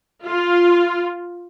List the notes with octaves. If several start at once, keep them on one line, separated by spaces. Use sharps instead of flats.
F4